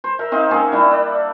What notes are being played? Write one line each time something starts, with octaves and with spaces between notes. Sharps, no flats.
C5
A#4 E5
C4 D#4 E5 F5
A#3 C#4 G#4
G3 D4 E4
D4